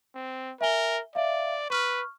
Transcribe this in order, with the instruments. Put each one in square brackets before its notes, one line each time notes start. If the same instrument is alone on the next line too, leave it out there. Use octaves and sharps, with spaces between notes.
[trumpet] C4
[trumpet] A#4 [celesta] E5 G#5 G7
[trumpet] D5 [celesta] E5 F5
[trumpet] B4 [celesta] C#6 F6